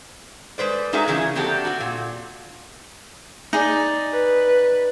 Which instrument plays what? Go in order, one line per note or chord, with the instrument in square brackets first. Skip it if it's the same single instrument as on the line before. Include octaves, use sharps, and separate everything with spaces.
[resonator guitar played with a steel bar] G#3 B4 C5 D5
G#3 D#4 F#4 G#4 A#4 E5
C#3 E3 C#4 E4 G#4
A#3 C4 D4 F#4 G4 A4
C4 F#4
A#2
[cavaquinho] D#4 G#4 D5
[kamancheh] B4